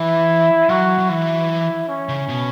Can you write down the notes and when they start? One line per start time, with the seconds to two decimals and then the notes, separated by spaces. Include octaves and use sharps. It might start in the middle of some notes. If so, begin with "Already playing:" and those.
Already playing: E3 E4
0.69 F#3 F#4
0.98 F#3
1.09 E3 E4
1.88 C#4
2.09 C#3
2.29 B2